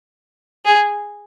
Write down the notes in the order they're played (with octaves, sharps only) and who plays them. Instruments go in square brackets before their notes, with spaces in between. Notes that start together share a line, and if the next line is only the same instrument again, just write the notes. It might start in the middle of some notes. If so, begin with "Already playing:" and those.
[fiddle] G#4